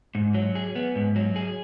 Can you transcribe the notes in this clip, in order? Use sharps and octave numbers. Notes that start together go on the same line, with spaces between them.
G#2
F#3
G#4
B3
G#2
F#3
G#4